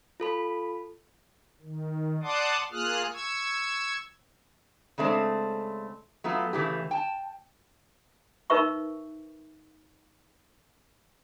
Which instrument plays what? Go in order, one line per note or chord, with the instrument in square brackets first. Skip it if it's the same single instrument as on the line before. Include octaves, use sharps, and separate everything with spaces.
[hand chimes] F4 A4 B5
[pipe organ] D#3
D5 F#5 A5 C6 D6 D#6
A#3 F4 G#4 D#6 F6 F#6
C#6 E6 G#6
[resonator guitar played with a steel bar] C#3 G#3 A3 C4 D4
F#3 A3 B3 F4
C#3 E3 A3 G4
G5 A5
[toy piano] D#4 A#4 B4 E5 C#6